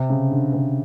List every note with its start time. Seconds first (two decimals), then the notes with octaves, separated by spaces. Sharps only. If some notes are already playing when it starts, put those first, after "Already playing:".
Already playing: C3
0.10 C#3
0.31 D3
0.53 C3